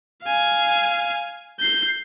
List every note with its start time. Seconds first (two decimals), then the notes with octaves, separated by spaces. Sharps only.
0.23 F5 G#5
1.60 G6 C7